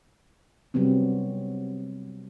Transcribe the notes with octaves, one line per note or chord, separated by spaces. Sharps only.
C3 F#3 G3 B3 C4